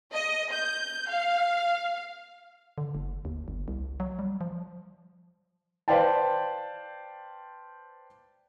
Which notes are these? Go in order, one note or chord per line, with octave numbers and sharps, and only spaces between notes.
D#5
G6
F5
D3
F#1
D#2
G1
C2
F#3
G3
F3
B4 C5 D5 F5 G5 A5